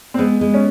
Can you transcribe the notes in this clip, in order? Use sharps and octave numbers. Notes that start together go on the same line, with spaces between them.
C4
G#3 B3
G#3
C#4